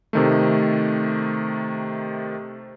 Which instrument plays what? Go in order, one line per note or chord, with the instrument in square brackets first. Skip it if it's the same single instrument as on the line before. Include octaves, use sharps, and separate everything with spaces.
[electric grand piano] C3 D#3 A3